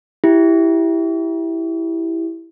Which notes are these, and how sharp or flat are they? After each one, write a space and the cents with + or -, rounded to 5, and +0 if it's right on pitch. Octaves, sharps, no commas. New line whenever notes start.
E4 +0 G4 +0